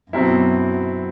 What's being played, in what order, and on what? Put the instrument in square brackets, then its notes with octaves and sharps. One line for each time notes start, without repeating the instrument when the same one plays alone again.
[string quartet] F#2 [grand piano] B2 F#3 C4 E4